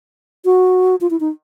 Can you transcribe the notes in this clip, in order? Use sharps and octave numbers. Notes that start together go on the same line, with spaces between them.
F#4
F4
E4
D#4